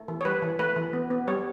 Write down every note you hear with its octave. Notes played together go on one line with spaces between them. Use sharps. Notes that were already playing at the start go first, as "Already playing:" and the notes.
Already playing: A3
E3
C#5
G3 B4
E3
A3 B4
E3
B3
B3
G3 C#5